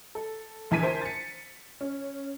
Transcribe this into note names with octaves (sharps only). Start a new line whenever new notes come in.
A4
A#1 E3 G#5 A5 B6 D#7
A#4 C5 G#5 A5
A6 C#7
C#4